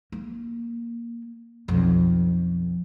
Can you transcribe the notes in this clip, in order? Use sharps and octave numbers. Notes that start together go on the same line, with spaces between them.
A#3
B1 F2